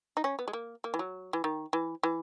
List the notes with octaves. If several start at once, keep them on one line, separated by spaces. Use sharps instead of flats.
D#4
C#4
B3
G#3
A#3
A#3
E3
F#3
E3
D#3
E3
E3